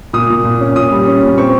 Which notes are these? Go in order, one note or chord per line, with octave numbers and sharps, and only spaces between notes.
A#2 D#6
A#2
A#2
C#4
A#2 D#6
G3
C#4
A#2
C4 C#6